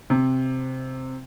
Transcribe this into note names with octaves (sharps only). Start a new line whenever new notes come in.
C3